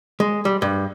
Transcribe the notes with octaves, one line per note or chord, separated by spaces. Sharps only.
G#3
G3
G2